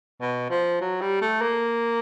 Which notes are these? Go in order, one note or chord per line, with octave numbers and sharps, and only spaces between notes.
B2
F3
F#3
G3
A3
A#3